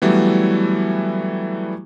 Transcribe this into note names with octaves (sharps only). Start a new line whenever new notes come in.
E3 F#3 G3 A3 B3 E4